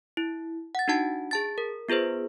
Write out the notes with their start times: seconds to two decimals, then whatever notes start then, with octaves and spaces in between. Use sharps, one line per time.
0.17 E4
0.75 F#5 A6
0.88 D4 D#4 F#4 F#5 A5
1.31 G#4 A5 A6
1.58 A#4
1.89 B3 F4 G#4 B4 C5